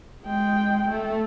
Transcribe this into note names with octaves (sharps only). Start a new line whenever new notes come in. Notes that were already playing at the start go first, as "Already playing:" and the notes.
G#3 G5
A3